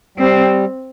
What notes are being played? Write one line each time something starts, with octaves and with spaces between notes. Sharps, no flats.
G3 C4